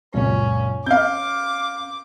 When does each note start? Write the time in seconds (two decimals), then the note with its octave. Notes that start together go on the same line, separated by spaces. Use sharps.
0.14 C#2 F#2 A#2 C#4
0.86 C#4 F5 D6 G6